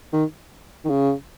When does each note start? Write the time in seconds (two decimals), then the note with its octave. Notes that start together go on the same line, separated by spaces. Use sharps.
0.13 D#3
0.85 D#3
0.90 C#3